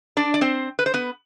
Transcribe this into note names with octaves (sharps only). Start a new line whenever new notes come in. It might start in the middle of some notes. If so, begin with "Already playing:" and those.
D4 D5
D5
C4 C5
B4
C5
B3 B4